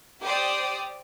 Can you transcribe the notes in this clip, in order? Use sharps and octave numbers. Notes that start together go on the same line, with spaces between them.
G4 C5 D5 D#6